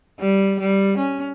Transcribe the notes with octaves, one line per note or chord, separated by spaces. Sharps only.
G3
G3
C#4